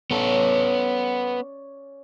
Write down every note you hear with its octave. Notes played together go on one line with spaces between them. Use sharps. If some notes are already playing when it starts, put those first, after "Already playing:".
B3 C#4 A4 C#5 D5